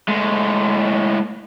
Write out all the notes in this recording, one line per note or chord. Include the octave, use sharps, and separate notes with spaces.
A2 G#3